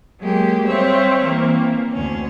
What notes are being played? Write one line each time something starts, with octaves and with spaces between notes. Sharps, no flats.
F#3 G#3 A#3 G4
G3 C4 C#5 E5 F5
E3 A#3 C4
D2 C#4